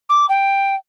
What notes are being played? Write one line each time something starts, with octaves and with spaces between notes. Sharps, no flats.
D6
G5